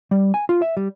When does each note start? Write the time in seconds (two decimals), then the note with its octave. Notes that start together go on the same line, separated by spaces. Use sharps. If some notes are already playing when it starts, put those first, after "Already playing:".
0.11 G3
0.34 G#5
0.49 F4
0.62 E5
0.77 G3